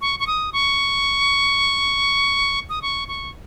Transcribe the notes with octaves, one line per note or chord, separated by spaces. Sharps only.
C#6
C#6
D#6
C#6
D#6
C#6
C#6